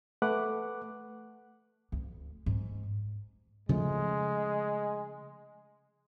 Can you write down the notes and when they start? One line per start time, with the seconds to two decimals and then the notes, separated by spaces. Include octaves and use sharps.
0.22 A3 B4 F#5 D6 F#6
1.92 D2
2.46 G#2
3.69 C#3 F3 G#3 A3